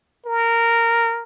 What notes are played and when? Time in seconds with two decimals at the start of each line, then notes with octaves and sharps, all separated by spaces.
0.26 A#4